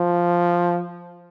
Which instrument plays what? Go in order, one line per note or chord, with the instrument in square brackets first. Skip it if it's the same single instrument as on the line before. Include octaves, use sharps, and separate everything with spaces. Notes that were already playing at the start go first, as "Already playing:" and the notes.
Already playing: [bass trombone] F3